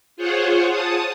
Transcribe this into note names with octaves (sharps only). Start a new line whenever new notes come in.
F4 G#4 C5 C#5 F#5
A5 D#6